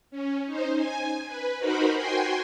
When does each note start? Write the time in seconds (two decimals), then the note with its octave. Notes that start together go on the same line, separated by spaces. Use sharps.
0.11 C#4
0.46 D#4 C5
0.76 G#5
1.27 B4
1.59 D#4 F#4 A#4 C5 B5
1.94 F#4 G5 G#5 C6